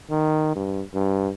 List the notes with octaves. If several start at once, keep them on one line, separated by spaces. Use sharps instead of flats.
D#3
G2
G2